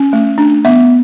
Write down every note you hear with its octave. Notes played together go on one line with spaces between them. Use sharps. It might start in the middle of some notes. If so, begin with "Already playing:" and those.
Already playing: C#4
A3
D4
B3 E5